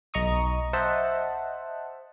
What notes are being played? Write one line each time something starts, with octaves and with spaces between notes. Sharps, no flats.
B1 D#5 A#5 C#6 D#6
C5 D#5 E5 F#5 A5